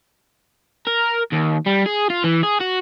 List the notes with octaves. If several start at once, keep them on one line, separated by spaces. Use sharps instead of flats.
A#4
D#2
G3
G#4
F4
E3
G#4
F#4